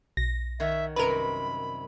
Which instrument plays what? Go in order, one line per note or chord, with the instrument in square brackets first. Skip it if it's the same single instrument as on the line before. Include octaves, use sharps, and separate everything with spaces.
[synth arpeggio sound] B1 [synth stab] A#6
[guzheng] D#3 C#5 F#5 [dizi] E5
[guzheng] F#2 C3 G3 [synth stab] A#4 B4 [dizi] B5